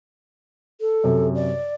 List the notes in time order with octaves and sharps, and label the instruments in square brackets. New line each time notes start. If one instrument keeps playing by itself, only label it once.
[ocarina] A4
[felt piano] F#2 C3
[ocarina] D5